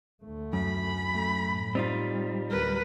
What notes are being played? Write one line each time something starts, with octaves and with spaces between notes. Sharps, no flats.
D2 A3
F#2 B5
A3
A2
G3 C4 D#4 F4
D2 A#4 B4